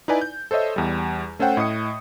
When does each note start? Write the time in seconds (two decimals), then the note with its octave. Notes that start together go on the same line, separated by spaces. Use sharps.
0.08 D#4 E4 B4 D5 G#5
0.21 G6
0.51 A4 C5 C#5 D#5 E5
0.76 E2 G3
1.39 A3 C#4 A4 C5 F#5 G5
1.57 A2 D#5 D#6 C#7